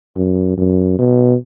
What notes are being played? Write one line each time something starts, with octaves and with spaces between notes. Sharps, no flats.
F#2
F#2
B2